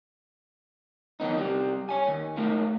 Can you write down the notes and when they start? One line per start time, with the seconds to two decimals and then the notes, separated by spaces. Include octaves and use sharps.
1.20 E2 D#3 B3 D#4
1.37 C3 G3
1.89 C#5 G#5
2.07 D#2
2.37 A3 A#3 D#4 A#4